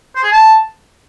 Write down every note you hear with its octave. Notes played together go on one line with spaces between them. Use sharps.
C5
G#4
A5